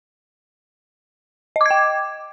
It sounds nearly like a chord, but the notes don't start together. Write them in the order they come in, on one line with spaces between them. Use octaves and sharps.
D#5 D6 G#6 G5